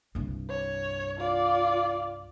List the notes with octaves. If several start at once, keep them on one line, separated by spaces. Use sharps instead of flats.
C2 G2
C#5
F4 D5